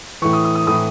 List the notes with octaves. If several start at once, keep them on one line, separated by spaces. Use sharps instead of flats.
A2 E3 C#6
D#6
D#6
D#6
A2 E3 D#6